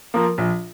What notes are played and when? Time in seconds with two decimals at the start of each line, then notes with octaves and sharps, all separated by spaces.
0.14 F3 A#3 F4 A#4
0.38 A#1